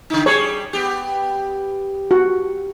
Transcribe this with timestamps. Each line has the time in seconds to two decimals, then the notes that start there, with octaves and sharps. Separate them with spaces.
0.10 C#3 D#4
0.26 G3 G#4 C#5
0.73 B3 G4
2.11 F#4